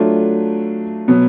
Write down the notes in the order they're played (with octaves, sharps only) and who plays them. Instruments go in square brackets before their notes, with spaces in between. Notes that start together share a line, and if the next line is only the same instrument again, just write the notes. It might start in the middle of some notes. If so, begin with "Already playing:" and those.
Already playing: [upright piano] F#3 A3 D4 F4
B2 F#3 B3